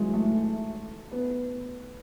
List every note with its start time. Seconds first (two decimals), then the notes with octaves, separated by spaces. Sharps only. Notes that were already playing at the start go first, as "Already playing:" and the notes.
Already playing: E3 F#3 G#3
0.13 A3
1.11 B3